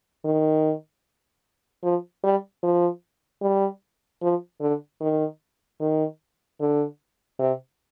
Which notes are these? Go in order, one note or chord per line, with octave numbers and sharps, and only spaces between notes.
D#3
F3
G3
F3
G3
F3
D3
D#3
D#3
D3
C3